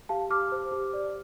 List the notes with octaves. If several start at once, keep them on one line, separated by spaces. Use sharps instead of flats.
G4 F5 A5
G4 D6 F6
C5
G4
D5